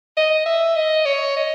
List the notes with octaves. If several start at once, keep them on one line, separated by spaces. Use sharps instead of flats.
D#5
E5
D#5
C#5
D#5